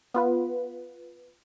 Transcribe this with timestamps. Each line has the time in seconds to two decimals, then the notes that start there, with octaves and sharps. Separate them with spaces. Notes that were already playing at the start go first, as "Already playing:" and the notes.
0.14 B3 F4 B4